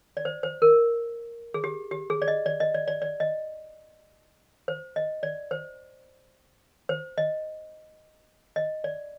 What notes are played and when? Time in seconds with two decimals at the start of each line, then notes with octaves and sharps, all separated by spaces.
0.17 D5
0.25 C5
0.43 C5
0.62 A#4
1.54 G#4
1.64 G4
1.91 G4
2.10 G#4
2.22 D5
2.28 D#5
2.46 D5
2.60 D#5
2.74 D5
2.88 D5
3.02 D5
3.20 D#5
4.68 C5
4.96 D#5
5.23 D5
5.51 C5
6.89 C5
7.18 D#5
8.56 D#5
8.84 D5